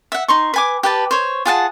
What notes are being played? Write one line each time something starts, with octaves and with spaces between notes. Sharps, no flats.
E5 F#5
D#4 C6 C#6
B4 G#5 D6
G4 B4 A5
C5 C#5
F4 G#4 F#5 A5